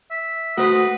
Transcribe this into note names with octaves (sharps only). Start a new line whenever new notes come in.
E5
A3 F#4 B4 C5 D#6